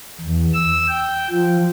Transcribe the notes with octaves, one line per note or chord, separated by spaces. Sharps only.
E2
E6
G5
F3